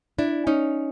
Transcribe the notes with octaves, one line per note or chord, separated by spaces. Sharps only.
D4 E4
C#4 D#4